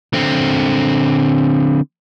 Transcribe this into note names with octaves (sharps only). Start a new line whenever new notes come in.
D3 C4